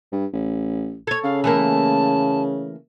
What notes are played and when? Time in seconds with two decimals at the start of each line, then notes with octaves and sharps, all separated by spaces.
0.12 G2
0.33 A1
1.07 A4 C#5 G#6
1.23 C#3 F5
1.44 E3 A3 A#3 A5